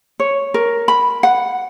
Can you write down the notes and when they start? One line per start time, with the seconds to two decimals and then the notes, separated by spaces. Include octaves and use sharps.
0.20 C#5
0.54 A#4
0.88 B5
1.23 F#5